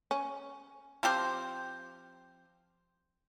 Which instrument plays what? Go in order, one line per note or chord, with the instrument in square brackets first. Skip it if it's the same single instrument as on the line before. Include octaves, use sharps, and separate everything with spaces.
[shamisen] C#4
[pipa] F3 C4 G4 C5